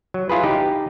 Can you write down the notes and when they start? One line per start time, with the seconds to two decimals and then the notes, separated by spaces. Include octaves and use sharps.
0.14 F#3
0.29 E4 F4 G#4 B4
0.43 D#4 G4